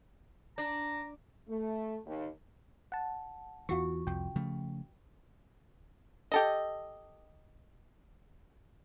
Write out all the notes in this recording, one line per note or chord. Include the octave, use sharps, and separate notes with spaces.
D4 A#5
A3
D#2
F#5 A5
E2 E3 F4 F#4 C#6
C2 F2 G5
C#3 F3 A3
G4 A4 D#5